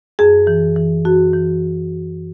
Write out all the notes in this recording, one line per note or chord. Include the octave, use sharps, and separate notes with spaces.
F#2 G#4
E3
E3
F#2 F#4
E3